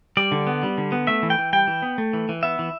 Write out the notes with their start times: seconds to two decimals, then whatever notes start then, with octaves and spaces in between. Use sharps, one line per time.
0.17 G3 D5
0.32 D3
0.47 B3
0.63 G3
0.78 D3
0.92 B3
1.07 A3 E5
1.23 E3
1.30 G5
1.38 E3
1.53 G3 G5
1.67 E3
1.82 B3
1.98 A3
2.13 E3
2.29 E3
2.43 B3 E5
2.59 E3